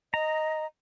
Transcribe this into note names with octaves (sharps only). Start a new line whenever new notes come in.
D#5 A#5